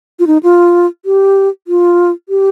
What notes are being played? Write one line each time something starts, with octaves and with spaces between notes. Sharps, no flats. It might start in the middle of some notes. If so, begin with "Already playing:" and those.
F4
D#4
F4
G4
F4
G4